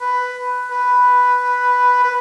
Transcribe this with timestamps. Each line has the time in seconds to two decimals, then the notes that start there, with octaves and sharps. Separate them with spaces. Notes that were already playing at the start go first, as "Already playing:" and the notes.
0.01 B4
0.71 B4
2.04 B4